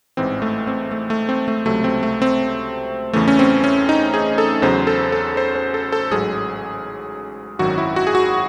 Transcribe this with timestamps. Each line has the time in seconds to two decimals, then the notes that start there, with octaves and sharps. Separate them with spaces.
0.17 A1 G#2 E3 C4
0.42 A3
0.67 C4
0.92 A3
1.10 A3
1.29 C4
1.48 A3
1.65 C#2 C3 F#3 A3
1.84 C4
2.03 A3
2.22 C4
3.13 E2 C#3 E3 A3
3.28 C#4
3.39 C4
3.64 C#4
3.89 D#4
4.14 G#4
4.38 A4
4.62 E2 C#3 F#3 C5
4.87 A4
5.12 A4
5.37 C5
5.55 C5
5.74 A4
5.92 A4
6.11 A1 G#2 F#3 G#4
7.59 G#1 F#2 D#3 F#3 F#4
7.78 E4
7.96 F#4
8.07 G#4
8.15 F#4